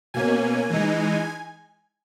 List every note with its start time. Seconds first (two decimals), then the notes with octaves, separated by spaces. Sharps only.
0.14 B2 A#3 C#4 G#5
0.70 E3 G#3 D#4